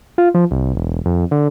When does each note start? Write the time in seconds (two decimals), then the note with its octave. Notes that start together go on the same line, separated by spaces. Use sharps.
0.18 F4
0.35 F3
0.51 C2
0.75 E1
1.06 F2
1.31 D3